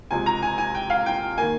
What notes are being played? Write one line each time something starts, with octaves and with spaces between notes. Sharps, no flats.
C#2 C3 F3 G#3 G#5
A#5
G#5
G#5
G5
F5
G5
D#3 A#3 G#5